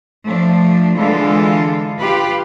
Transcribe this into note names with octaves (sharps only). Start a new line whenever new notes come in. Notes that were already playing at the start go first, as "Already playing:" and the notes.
F3 A3 D4
D3 E3 G#3 F4 A4
F4 G4 B4